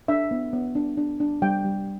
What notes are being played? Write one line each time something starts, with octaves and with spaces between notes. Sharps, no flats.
D4 E5
B3
B3
D4
D4
D4
G3 G5
G3